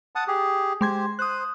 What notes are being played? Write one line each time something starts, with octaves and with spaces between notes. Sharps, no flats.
F#5 A5 D#6
G4 G#4
G#3 G4 C5 C6 G#6
C5 D#6 F#6